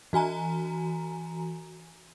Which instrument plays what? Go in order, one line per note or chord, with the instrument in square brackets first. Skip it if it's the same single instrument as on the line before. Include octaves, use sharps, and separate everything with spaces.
[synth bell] E3 F#4 G#5 A#5